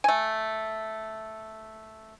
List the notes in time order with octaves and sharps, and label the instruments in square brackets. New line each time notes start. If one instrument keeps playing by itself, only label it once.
[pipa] A3 G#5